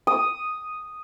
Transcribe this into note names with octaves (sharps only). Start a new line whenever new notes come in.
D#6